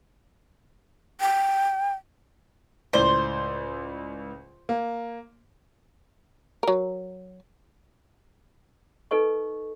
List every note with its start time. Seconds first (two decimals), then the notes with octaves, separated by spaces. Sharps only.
1.21 G5
2.93 C#2 A2 C5 D5
4.69 A#3
6.63 F#3 A#4
9.11 D#4 A4 B4 D#5 C#6